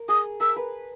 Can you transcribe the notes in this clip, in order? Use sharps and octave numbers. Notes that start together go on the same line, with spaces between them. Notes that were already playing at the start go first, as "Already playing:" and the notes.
Already playing: A#4
G#4 D#6
A#4 E6
B4